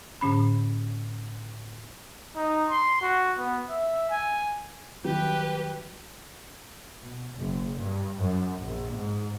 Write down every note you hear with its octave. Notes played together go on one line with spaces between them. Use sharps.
A2 D3 C#4 B5
D#4
C6
F#4
B3
E5
G#5
D#3 F#3 G3 G4 B4
B2
F#1
G2
F#2
A#1
G#2